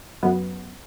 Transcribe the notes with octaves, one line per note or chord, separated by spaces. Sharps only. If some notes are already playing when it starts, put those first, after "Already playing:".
F#2 B3